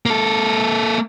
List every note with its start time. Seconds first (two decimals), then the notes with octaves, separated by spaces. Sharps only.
0.06 A#3 A4